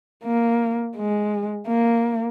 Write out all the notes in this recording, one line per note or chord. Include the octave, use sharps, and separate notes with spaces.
A#3
G#3
A#3